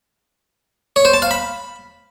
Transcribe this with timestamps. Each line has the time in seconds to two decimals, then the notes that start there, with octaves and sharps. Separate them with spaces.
0.96 C#5
1.05 C5
1.13 A5
1.22 F5
1.31 B5